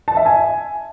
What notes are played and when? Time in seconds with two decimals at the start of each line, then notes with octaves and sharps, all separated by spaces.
0.08 A5
0.17 E5
0.26 G#5